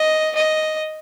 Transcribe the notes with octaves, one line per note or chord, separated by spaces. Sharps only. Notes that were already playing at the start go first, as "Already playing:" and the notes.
Already playing: D#5
D#5